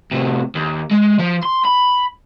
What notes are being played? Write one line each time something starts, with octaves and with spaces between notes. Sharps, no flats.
A2 C3
D#2
G#3
F3
C6
B5